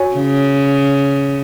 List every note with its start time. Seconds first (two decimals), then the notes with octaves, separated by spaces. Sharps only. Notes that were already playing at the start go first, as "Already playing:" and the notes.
Already playing: F#4 C#5 G#5
0.15 C#3